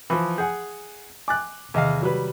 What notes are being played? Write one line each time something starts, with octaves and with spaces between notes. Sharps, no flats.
E3 F3
G#4 F#5 G#5 G6
G#5 D6 F#6 A6
E2 C3 D#3 D#5 F5
F#3 G3 B4